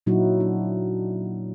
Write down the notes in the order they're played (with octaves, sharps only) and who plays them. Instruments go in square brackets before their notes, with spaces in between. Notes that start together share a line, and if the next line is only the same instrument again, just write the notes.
[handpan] A#2 F#3 D#4 E4 F#4
D4